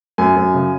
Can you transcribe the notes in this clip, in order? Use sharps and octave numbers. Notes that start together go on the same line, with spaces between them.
F#2 G#5
F#2
C#3